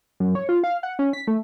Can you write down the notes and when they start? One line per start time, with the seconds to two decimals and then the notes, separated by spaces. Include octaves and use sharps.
0.20 F#2
0.35 C#5
0.49 F4
0.64 F5
0.83 F#5
0.99 C#4
1.13 B6
1.27 A3